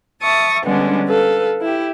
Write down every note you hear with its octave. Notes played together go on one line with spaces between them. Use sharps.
E5 A5 C#6 D#6
D3 G3 G#3 B3 C#4 D4
A4 B4 F5
E4 G4